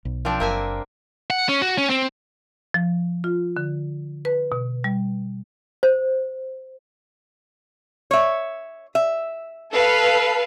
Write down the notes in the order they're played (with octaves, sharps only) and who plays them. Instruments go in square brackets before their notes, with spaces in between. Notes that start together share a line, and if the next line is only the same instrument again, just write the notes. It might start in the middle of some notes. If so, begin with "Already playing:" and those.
[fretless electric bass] B1
[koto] F3 C4 D4
[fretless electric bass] F#1 [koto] A#3 E5 G#5
[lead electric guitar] F#5
C#4
F#4
C#4
C4
[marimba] F3
F4
D3
B4
B2
G3
[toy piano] C5
[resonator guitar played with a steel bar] C#5 E5
E5
[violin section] A4 B4 F5